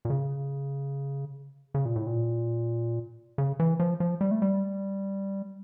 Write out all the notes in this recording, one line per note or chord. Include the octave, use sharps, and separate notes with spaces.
A#2
C#3
C#3
A#2
A2
A#2
C#3
E3
F3
F3
G3
A3
G3